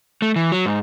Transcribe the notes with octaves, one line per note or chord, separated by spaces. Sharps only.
A3
E3
F#3
G#2